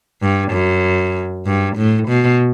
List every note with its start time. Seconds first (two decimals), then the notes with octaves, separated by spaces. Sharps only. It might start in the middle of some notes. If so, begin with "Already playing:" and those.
0.22 G2
0.52 F#2
1.46 G2
1.76 A2
2.08 B2